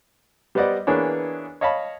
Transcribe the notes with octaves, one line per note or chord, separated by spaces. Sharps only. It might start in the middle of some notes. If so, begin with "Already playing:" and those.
G3 B3 C5 D5 D#5 F#5
E3 A#3 B3 D4 G#4 C#5
C#5 D#5 F5 A5 B5